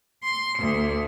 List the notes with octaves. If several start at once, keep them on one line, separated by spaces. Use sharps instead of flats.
C6
D2